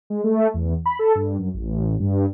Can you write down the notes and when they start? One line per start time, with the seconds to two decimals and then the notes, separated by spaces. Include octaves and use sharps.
0.10 G#3
0.24 A3
0.54 E2
0.86 B5
0.99 A4
1.15 G2
1.39 F#2
1.54 A1
2.00 G2